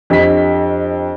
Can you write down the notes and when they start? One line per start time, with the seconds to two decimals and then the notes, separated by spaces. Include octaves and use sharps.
0.10 F2 D4 G4 D#5 B6